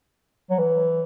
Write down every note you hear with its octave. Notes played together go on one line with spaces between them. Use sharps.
F#3
E3